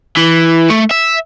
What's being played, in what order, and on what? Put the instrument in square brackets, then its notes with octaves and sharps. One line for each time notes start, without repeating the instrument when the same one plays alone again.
[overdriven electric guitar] E3
A3
E5